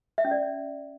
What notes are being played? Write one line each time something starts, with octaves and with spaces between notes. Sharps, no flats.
E5
C#4
D5